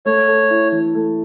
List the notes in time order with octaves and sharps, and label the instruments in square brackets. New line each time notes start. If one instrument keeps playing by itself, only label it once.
[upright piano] A3 [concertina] C#5
[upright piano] A4
E4
E3
A3